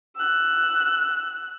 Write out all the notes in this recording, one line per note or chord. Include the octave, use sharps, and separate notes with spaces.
E6 F#6